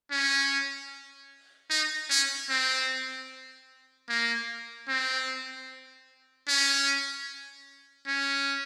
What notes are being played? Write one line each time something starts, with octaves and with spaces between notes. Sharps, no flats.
C#4
D#4
C#4
C4
A#3
C4
C#4
C#4